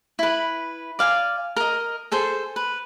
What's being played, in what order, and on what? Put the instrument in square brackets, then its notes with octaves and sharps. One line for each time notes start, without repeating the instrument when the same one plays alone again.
[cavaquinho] E4 B4
D5 F5 G5 G#5
A#4 D#5
G#4 A4 C5 C6
B4